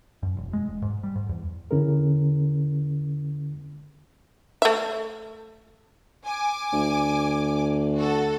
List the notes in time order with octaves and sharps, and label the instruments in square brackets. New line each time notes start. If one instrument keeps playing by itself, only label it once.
[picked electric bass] F#2
E1
G#3
E1
G#2
G3
G#2
E2
[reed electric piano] E2 D3 C#4 E4 G#4 A#4
[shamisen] A3 E5
[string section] G#5 D6
[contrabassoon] D2
[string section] F#4 A4